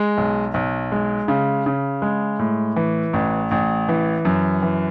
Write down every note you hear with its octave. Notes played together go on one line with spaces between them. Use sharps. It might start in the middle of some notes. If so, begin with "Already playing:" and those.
Already playing: G#3
B1
B1
G#3
C#3
C#3
G#3
A2
E3
A1
A1
E3
F#2
E3